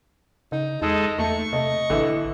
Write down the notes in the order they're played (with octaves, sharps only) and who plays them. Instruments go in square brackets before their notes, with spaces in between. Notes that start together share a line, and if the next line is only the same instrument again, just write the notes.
[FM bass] C#3 [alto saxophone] D#4
[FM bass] E2 [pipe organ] G#3 A4 [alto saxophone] D#4
[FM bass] E2 [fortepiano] A3 [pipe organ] C#6
[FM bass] C3 [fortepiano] A3 [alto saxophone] D#5
[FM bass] A1 [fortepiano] D3 E3 E5